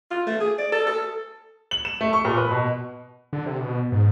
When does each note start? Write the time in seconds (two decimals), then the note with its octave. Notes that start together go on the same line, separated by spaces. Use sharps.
0.11 F4
0.27 A3
0.40 G#4
0.58 D5
0.72 A4
0.87 A4
1.71 F#7
1.85 E7
2.01 A3
2.13 C#6
2.25 A#2
2.37 B4
2.51 B2
3.33 D3
3.46 C3
3.59 B2
3.92 G#2